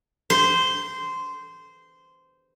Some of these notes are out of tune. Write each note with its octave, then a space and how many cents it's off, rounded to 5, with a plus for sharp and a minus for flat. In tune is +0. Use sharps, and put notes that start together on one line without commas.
C5 -15